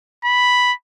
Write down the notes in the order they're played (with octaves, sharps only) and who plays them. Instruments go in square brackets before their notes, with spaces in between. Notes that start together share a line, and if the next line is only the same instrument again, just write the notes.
[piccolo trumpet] B5